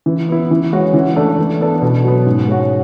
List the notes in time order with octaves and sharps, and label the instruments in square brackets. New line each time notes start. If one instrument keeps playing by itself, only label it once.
[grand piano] E3
B3 E4
E3
G#3 C#4 F#4
E3
A3 D4 A4
E3
B3 D4 A4
B2
F#3 B3
G#2
G#3 C#4 F#4